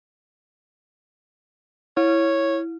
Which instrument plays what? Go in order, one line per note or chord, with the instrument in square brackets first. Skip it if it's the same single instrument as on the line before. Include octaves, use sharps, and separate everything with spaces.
[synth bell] E4 [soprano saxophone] C#5